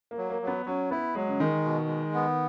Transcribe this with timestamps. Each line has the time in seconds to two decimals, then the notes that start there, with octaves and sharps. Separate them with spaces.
0.11 A#3
0.18 F#3
0.30 A#3
0.42 F#3
0.47 B3
0.66 F#3 C#4
0.91 B3 E4
1.15 F#3 G#3
1.28 C#3
1.39 D#3 G#3
1.65 B2
1.88 G#3
2.14 B3